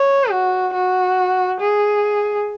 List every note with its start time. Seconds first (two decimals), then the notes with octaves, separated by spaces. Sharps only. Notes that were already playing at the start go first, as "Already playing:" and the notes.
Already playing: C#5
0.30 F#4
0.74 F#4
1.60 G#4